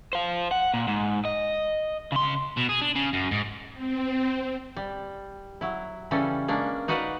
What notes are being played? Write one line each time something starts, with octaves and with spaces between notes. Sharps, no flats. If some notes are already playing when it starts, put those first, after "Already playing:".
C5 F5
F#5
A#2
G#2
D#5
C#3 C6
B2
G#4
D4
C#3
F#2
G#2
C4
G3
F#3 E4
C#3 E3 G3 C#4 A4
G#3 A#3 C#4 D4
D#4 F#4 B4 D5 D#5 F5